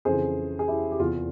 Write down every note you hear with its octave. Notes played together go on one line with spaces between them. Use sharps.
F2 C#3 E3 G#4 C5
G#4
E4 G4
G4
E2 C3 E3 F4 G#4